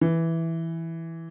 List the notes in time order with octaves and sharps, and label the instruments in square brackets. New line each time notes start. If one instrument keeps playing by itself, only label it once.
[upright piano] E3